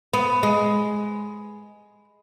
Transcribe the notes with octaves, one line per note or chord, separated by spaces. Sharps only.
B3
G#3